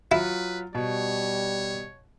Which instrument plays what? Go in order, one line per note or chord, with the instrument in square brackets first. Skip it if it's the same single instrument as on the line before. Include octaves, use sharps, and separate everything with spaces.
[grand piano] F#3 F4 [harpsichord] E4 [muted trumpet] B4
[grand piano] B2 [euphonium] G3 [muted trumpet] C#5